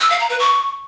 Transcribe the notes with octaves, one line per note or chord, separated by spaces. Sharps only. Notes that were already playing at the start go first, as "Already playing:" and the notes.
E6
F5
A#5
B4
C#6